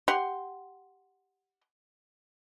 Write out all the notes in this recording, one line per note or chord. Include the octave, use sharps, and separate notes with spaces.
G4 F#5 C6